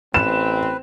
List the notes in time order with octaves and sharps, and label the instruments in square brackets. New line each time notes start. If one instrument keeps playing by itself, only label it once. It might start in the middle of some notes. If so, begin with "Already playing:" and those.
[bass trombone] A1 [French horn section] C4 [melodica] B4 [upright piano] E7